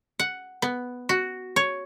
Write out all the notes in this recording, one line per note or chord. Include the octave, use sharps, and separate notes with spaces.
F#5
B3
F#4
C#5